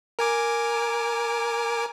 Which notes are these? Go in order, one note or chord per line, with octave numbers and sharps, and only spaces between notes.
A#4 G#5 D6